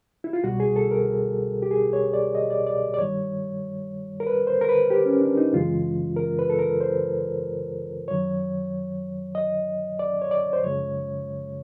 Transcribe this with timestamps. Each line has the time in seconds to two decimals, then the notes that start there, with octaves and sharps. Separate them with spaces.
0.24 E4
0.33 F4
0.44 C2 B2 G3 F#4
0.60 G#4
0.76 A4
0.91 A#4
1.62 G4
1.71 G#4
1.93 C#5
2.14 D5
2.35 D#5
2.50 D5
2.66 D5
2.94 D5
2.98 G2 D#3 G3 C#5
4.20 A#4
4.27 B4
4.47 C5
4.61 A#4
4.69 B4
4.90 G4
5.06 C#4
5.21 D4
5.37 D#4
5.53 F#2 C#3 E3 G#3 F4
6.17 A#4
6.39 B4
6.50 A4
6.59 A#4
6.81 C5
8.08 F#2 D#3 F#3 C#5
9.35 D#5
9.99 D5
10.22 C#5
10.31 D5
10.53 C5
10.63 F#2 C#3 F3 G#3 C#5